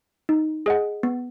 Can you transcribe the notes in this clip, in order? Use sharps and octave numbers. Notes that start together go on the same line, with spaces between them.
D#4
G#4 D#5 F#5
B3